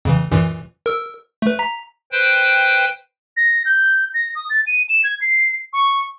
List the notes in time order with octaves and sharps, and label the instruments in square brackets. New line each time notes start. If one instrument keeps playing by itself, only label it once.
[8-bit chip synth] F2 C#3 E3
F#2 A#2 E3
A#4 E6
A3 B4
A#5 B6
[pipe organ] B4 C5 G5
[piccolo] A#6
G6
A#6
D#6
A6
D#7
E7
G#6
C7
C#6